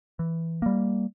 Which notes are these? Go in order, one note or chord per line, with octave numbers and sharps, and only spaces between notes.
E3
G3 A#3